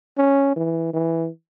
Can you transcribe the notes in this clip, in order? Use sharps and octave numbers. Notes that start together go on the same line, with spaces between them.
C#4
E3
E3